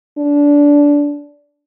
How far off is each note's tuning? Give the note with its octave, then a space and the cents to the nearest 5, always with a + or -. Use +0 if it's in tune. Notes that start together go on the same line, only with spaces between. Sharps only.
D4 -20